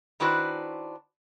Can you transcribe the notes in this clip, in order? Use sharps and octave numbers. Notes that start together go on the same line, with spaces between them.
D#3 D4 E4 F#4 B4 C5